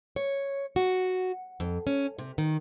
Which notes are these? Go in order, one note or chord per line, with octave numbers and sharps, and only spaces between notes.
C#5
F#4
F2
C#4
C3
D#3